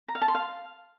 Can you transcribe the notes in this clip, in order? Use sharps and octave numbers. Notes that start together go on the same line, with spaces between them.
A#5
F5
A5
C6
F5